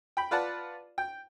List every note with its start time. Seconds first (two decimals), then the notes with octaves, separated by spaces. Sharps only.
0.17 G5 B5
0.31 F4 B4 D5 F#5 A5
0.98 G5